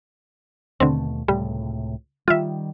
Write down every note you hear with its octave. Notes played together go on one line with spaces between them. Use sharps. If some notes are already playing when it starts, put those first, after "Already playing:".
D#2 B2 D3 A3 C4
C#2 A2 C3 G3
D#3 G3 F4 E5